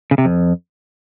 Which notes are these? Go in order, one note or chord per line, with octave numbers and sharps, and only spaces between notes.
C#3
C3
F2